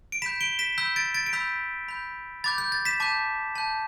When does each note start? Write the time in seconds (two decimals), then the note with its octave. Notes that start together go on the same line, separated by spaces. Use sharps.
0.12 D7
0.22 B5 G6 B6 E7
0.41 D7 G7
0.59 B6 E7
0.78 B5 E6 G6 B6
0.96 A6 D7
1.14 A6 D7
1.26 D7
1.33 B5 E6 G6 B6
1.88 B5 G6
2.44 B5 D6 G6 A6
2.58 G6
2.72 A6
2.85 B6 E7
3.00 A5 D6 G6
3.55 A5 G6